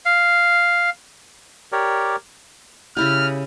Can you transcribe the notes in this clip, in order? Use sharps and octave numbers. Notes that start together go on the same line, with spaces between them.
F5
G4 A#4 C#5 D5
C#3 E4 G4 F6